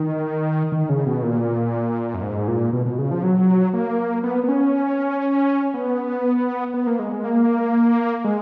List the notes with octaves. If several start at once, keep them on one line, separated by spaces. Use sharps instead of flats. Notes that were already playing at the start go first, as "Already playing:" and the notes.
Already playing: D#3
D#3
C#3
B2
A#2
F#2
G#2
A#2
B2
B2
C#3
F3
F#3
A#3
B3
B3
C#4
B3
B3
A#3
G#3
G#3
A#3
G#3